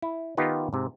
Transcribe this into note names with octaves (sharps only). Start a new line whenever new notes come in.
E4
D#3 B3 D#4 F4 G4 B4
G#2 C3